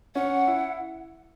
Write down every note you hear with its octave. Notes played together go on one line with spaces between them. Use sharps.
C#4 F#5
E4